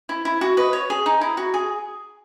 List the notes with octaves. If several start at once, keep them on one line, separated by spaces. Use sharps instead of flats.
E4
E4
F#4
B4 D#5
C#5
G#4
D#4
E4
F#4
G#4